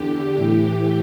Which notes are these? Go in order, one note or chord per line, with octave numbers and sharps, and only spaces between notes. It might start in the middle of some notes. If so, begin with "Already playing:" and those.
Already playing: E2 D3 G4
A2 E3